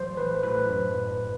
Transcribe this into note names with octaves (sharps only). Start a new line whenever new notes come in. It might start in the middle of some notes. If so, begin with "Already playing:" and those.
Already playing: A1 F#3 C5
A1 B4
A2 B4
F#2
G1